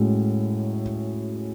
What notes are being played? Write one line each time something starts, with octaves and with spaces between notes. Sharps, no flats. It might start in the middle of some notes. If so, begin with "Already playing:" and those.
Already playing: A2 G#3 C#4 F#4